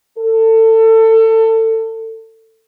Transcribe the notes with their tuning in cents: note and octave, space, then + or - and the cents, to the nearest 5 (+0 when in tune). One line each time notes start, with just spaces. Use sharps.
A4 +25